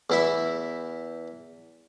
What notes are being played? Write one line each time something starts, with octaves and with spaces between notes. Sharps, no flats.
E2 E4 E5